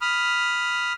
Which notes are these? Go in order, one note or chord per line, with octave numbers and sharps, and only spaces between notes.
B5 D#6 F6